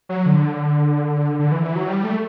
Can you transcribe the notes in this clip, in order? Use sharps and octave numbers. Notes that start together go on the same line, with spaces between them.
F#3
D3
D3
E3
E3
F#3
G3
A3